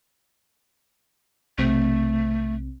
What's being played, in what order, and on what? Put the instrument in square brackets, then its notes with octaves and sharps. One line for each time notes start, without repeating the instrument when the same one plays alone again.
[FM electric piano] B1 C3 C4 [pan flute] A3